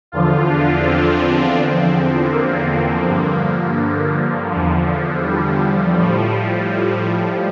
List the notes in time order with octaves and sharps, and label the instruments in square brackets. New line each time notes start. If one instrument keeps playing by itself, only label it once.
[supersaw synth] E2 D3 F3 F4
D4
C4
E2 D3 F3
A#3
G2 D3 F3
E2 D3 F3
G3
A2 F3